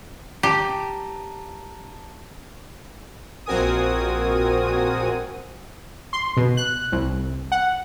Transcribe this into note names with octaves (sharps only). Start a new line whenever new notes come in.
G4 A5 A#5
A#1 C4 F#4 A#4 G#5 D#6
C6
B2
F#6
C2
F#5